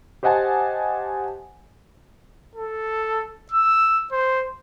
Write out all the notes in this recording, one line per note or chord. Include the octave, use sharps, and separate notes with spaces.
G4 C5 D#5 F#5 G#5 A5
A4
E6
C5